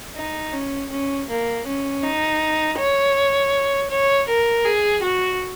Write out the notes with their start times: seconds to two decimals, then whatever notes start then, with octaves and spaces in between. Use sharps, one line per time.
0.16 D#4
0.53 C#4
0.90 C#4
1.29 A#3
1.66 C#4
2.03 D#4
2.78 C#5
3.90 C#5
4.28 A#4
4.65 G#4
5.02 F#4